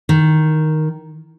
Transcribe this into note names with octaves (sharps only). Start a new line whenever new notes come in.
D#3